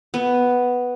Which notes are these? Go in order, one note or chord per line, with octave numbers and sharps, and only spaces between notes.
B3